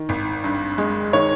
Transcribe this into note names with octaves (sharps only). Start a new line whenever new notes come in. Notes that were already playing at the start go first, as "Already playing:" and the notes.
Already playing: D#3
G#1
G2
G#3
D#3 C#5